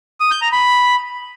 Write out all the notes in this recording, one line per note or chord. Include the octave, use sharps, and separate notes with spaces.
D#6
G6
A#5
B5